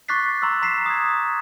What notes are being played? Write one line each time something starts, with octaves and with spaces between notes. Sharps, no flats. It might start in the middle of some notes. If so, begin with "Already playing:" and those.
C#6 D6 F#6 A6 B6 C7
A#5 C6 C#6 E6
A#5 B6 C7 E7
D#6 G#6